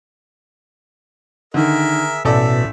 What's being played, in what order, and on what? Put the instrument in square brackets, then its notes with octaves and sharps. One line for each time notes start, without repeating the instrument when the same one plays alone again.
[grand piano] D3 D#3 [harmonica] G#4 A#4 E5
[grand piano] A1 A4 D5 [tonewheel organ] B2 [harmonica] E5